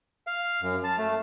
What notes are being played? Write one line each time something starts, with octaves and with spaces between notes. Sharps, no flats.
F5
F#2
A5
A3